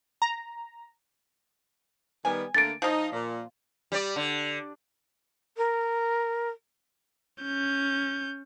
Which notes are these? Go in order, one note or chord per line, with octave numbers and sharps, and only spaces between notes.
A#5
D#3 G3 B3 G#5
D3 A3 A#3 A6 D7
F3 D#4 F4
A#2
G3 D5
D3
A#4
C#4 G6